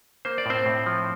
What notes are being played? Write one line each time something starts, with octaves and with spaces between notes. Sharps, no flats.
A#3 C5
D5
A2 C4 C5
A2
F3